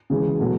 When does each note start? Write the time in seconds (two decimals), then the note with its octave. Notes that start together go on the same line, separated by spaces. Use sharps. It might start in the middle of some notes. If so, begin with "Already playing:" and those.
0.10 C#3 E3 G#3
0.39 B2 F#3 A3